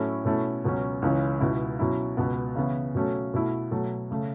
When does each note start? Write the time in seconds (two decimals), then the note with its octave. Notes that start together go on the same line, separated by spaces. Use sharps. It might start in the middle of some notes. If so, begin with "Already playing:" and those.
Already playing: A2 F#3 A3 C#4 E4
0.25 B2 A3 C#4 E4
0.64 C#2 B2 F#3 C#4
1.02 C#2 C#3 E3 C#4
1.40 C#2 B2 B3 E4
1.79 B2 F#3 C#4 E4
2.17 C#2 B2 B3
2.56 C#3 E3 B3 E4
2.95 B2 F#3 A3 C#4
3.34 B2 A3 E4
3.71 B2 F#3 A3
4.11 C#3 A3